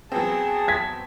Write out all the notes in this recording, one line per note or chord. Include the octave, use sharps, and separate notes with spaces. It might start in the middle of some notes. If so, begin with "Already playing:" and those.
F#3 B3 C4 G#4 A5
G#6 B6